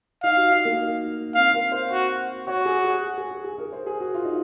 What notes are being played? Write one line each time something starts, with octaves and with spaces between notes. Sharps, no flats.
D#4 F5
F#4
D#4
A#3
C4 F5
A#4
C5
F#4
F#4 C#5
G#4
G#4
G#4
G#4
G#4
A#4
C5
G#4
F#4
F4
D#4